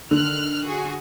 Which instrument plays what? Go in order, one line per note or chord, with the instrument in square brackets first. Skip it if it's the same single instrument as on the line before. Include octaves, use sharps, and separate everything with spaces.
[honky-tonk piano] D3 [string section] D#3 F6 F#6
[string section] F#4 G#4